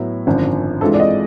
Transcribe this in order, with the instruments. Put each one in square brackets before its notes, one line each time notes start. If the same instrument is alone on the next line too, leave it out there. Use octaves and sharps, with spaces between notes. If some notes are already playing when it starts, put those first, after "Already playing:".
Already playing: [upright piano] A2 F#3 B3 E4
G#1 F#2 D3 F3
G2 E3 G#3 C4 F4 A4
D5
D#5